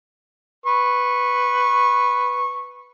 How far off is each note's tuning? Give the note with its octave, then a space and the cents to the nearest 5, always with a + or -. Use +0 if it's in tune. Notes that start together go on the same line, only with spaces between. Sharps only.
B4 +0 C#6 -15